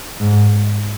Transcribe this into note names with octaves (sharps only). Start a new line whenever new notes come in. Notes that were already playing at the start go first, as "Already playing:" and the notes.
G#2